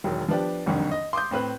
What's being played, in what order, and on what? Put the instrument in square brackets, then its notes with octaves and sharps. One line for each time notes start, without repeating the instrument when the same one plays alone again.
[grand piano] E1 D#3 F#3
F3 B3 D4 G4
F#1 C2 F2 D3 D#3
D#5
C6 D6 D#6 G6
A2 C4 B4 F#6